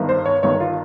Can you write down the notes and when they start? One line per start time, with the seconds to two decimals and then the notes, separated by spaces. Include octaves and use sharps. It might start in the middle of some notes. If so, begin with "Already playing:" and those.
Already playing: G1 G2 D#3
0.09 C5
0.26 C#5
0.43 G1 G2 D#3 C#5
0.60 F4